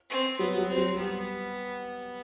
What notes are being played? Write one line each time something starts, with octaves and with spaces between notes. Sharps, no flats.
C4
F#3 B3
F#3
C4
F#3
G3 B3